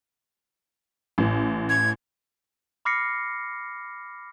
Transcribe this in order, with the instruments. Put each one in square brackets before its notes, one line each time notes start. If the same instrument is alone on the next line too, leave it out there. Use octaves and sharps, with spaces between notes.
[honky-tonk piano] A1
[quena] G#6
[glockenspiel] B5 D6 F6 A#6 C7 C#7